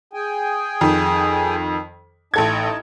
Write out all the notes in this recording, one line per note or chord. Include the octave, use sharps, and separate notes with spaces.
G#4 G5 G#5
F2 D#3
A1 D#4 A4 D#5 A5 G#6